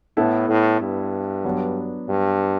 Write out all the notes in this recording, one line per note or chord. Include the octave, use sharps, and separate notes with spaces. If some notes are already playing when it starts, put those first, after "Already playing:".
A2 B3 E4 A4
A2
G2
F#3 B3 D4
G2